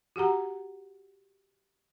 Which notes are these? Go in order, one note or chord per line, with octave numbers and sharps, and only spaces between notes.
F#4 G4 F#5 A#5